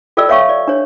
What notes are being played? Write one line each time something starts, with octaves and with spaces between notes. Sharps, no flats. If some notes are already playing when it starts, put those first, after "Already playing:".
F4 A4 D5 D#5 G5 E6
C#5 E5 F5 G5 C#6
D5
D4 C#5